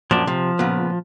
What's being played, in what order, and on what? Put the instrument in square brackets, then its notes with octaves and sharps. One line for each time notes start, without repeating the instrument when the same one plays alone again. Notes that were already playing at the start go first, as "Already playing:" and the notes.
[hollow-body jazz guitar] F#2 A#2 [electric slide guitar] F3 D4
[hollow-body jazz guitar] C3 [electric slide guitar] F3
[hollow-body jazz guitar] A#2 C#3 B3